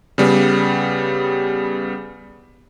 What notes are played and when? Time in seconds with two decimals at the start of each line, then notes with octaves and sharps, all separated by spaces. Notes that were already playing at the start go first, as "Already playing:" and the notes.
0.18 C#3 G3 B3